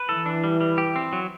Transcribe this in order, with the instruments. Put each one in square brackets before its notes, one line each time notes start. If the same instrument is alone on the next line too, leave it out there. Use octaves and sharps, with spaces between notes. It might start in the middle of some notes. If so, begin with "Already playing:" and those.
Already playing: [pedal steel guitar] B4
[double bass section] E3 [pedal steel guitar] A4
[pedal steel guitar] D4
G3
G3
G4
C4
F#3